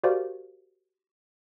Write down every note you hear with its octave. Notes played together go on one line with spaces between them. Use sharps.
F#4 G4 A#4 C5 D5 F5